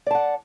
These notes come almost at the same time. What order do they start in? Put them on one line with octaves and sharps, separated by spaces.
D5 A5 F#5